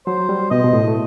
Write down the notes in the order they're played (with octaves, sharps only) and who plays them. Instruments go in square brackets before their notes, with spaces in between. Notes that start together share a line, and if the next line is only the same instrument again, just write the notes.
[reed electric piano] F#3 [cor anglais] C5
[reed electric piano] G3
[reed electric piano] B2 [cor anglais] D#5
[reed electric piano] B2
A2
A3